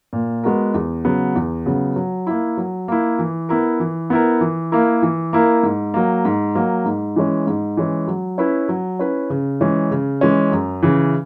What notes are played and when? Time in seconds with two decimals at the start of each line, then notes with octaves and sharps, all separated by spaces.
0.13 A#2
0.44 G#3 B3 F#4 A#4
0.74 E2
1.05 C#3 F#3 B3
1.36 E2
1.66 C#3 F#3 B3
1.96 F#3
2.27 A#3 E4
2.57 F#3
2.88 A#3 E4
3.19 E3
3.49 B3 E4 A#4
3.80 E3
4.10 B3 E4 A#4
4.41 E3
4.72 A#3 E4 A#4
5.02 E3
5.33 A#3 E4 A#4
5.63 G#2
5.94 F#3 A#3
6.25 G#2
6.55 F#3 A#3
6.85 G#2
7.16 E3 G#3 C#4
7.47 G#2
7.77 E3 G#3 C#4
8.08 F#3
8.38 C#4 E4 B4
8.69 F#3
8.99 C#4 E4 B4
9.30 C#3
9.61 E3 G#3 C#4
9.91 C#3
10.21 E3 G#3 C#4
10.52 F#2
10.83 C#3 E3